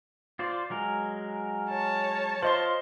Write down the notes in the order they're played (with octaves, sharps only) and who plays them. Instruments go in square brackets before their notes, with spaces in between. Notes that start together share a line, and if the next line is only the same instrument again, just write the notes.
[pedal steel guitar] F4 C5 D5
F#3 G#3 A#4
[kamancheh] C#5 A5
[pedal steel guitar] F4 [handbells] C5 D#5 C6